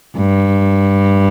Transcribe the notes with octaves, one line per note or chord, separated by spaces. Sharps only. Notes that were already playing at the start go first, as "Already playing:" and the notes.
G2